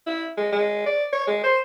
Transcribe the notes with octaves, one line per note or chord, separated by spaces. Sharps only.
E4
G#3
G#3
D5
C#5
G#3
C5